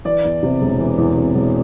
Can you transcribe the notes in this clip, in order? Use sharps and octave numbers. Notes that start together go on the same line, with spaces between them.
E3 D5
E2
C3
E1
E3
E2
C3
E1